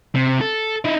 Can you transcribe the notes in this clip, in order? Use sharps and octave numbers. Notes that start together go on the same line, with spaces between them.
C3
A4
D#4 E4